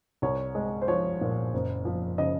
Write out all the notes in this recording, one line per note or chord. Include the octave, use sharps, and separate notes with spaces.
C2 C#5
G#3
C5
F3 C#5
A#2
F#1
F3
C#3 D#5